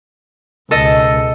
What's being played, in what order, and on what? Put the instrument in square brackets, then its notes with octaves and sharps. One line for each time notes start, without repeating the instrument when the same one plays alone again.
[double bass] C#2 B2 [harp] A4 D#5 E6